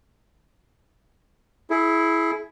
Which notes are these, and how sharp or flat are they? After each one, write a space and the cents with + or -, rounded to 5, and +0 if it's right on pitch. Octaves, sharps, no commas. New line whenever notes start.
E4 +0 G#4 +30